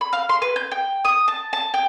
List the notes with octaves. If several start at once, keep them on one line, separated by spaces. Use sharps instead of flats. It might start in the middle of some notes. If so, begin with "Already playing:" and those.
B5
F5
C6
B4
G6
G5
D#6
A5
A5
G5